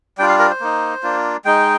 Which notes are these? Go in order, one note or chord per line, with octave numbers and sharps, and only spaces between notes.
G3 D4 F4 G5
F5
A#4
C5
A#3 D#4
A#3 D4 F4
G#3 D#4 G5